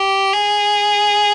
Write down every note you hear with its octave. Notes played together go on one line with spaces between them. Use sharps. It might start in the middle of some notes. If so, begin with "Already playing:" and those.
Already playing: G4
G#4